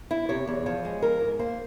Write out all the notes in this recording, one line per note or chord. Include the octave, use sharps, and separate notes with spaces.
E4
C3 C#5
E2
F3 C#5
G#3
F3 A#4
G#2
A#3 C5